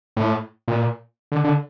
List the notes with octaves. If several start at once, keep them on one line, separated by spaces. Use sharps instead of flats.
A2
A#2
D3
D3